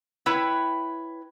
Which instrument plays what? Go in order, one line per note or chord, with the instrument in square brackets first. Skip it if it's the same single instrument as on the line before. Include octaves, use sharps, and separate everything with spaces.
[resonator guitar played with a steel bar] E4 B4 C#5 G5